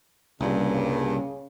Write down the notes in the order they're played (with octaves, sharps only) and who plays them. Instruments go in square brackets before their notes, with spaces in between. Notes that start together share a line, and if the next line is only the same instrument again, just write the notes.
[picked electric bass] C2 [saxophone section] G2 A#2 [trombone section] C#3